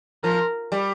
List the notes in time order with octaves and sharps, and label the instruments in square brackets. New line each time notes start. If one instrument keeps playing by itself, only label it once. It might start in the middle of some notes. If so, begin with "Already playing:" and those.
[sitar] F3 [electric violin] A#4
[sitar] G3